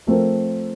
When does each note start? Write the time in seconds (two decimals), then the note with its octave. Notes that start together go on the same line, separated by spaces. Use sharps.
0.07 F3 A3 C4 F4 A#4